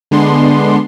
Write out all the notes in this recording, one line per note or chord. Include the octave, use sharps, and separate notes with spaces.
D3 G#3 B3 D4 C6